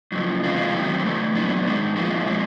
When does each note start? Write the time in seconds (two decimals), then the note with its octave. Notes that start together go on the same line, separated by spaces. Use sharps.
0.12 F#2 C#3 F3
0.43 C3 E3 G#3 C4 F4
0.73 D#3 F#3 A3 C4
1.05 C#3 E3 A3
1.35 A#2 F#3 B3 D4
1.66 G#2 D#3 G#3
1.96 A#2 F3 G#3 C4 F4
2.27 B2 G#3 C4